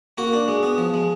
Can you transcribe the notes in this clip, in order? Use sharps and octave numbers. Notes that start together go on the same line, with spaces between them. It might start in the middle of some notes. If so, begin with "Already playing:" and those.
A#3 F#4
D4
G#3
B3
F3
G#3